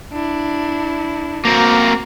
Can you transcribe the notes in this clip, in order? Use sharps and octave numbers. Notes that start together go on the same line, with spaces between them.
D4 E4
A#3 C4 F#4 A#5